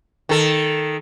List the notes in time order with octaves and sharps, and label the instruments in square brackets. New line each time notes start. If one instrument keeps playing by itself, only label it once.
[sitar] D#3 A4